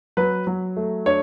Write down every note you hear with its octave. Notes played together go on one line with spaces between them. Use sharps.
F#3 B4
F#3
A3
D4 C#5